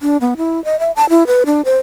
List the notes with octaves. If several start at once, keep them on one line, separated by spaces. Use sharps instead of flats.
D4
B3
E4
D#5
E5
A5
E4
B4
D4
C5